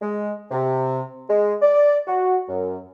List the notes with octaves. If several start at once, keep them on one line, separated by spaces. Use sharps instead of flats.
G#3
C3
G#3
D5
F#4
F#2